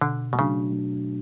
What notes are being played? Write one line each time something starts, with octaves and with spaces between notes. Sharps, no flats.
B2 D3
B2
C#3 F#3 A3 D4 F#4